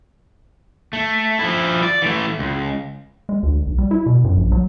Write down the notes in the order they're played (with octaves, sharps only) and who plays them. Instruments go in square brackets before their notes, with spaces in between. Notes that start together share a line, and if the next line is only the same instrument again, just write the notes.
[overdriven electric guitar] A3
F3 E4
D5
E3 A3
C#2
[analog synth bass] G#3
D2
B1
G3
E4
B2
F#2
A#1
F#3